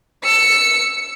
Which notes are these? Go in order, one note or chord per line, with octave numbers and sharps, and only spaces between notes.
E6 C#7